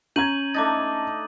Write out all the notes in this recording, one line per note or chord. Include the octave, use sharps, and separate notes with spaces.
C#4 A#5 G6 G#6 D#7 F#7
A3 D4 D#4 D6 A6